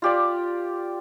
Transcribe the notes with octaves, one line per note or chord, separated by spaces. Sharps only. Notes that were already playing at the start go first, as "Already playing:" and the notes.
F4 G4 D5